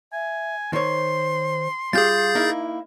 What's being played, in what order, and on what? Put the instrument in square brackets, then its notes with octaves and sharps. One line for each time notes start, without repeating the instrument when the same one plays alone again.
[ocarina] E5 [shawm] G#5
[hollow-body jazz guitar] D#3 C#5 [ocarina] C5 [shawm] C6
[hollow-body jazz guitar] G3 F4 G4 [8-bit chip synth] G#4 G6 A6 [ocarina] F5
[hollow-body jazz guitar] A#3 D#4 E4